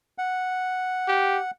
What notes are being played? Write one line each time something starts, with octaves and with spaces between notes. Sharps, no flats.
F#5
G4